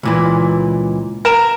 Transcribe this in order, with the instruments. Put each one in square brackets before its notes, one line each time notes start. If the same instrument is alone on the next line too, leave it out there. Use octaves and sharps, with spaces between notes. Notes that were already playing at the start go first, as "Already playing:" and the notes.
[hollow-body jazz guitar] C#2 A#2 E3
[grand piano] A#4 A#5 E7